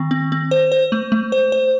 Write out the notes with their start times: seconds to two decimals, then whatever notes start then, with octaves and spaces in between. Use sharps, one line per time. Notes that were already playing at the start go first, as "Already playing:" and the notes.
Already playing: D#3 C4
0.11 C4
0.32 C4
0.51 C5
0.72 C5
0.92 A3
1.12 A3
1.32 C5
1.52 C5